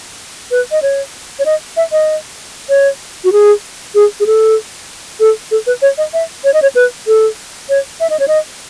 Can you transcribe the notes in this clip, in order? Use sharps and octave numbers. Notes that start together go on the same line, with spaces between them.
B4
D#5
C#5
C#5
D#5
E5
D#5
C#5
F#4
G#4
G#4
G#4
A4
A4
A4
B4
C#5
D#5
E5
C#5
D#5
C#5
B4
A4
C#5
E5
D#5
C#5
D#5